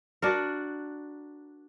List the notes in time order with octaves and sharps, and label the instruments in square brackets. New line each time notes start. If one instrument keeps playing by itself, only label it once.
[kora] D4 F#4 A#4